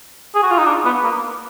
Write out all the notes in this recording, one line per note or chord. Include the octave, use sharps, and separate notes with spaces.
G#4
F#4
F4
D#4
D4
B3
A#3